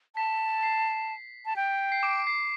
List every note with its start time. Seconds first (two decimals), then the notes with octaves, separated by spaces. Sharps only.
0.16 A5 B6
0.63 C7
1.46 A5
1.56 G5
1.92 C7
2.03 D6 D7
2.27 C7